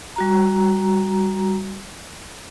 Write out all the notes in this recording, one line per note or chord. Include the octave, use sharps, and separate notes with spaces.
G3 F#4 A#5